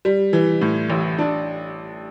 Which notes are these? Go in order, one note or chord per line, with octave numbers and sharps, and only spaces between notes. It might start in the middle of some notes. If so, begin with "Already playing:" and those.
G3
E3
A2
A1
D4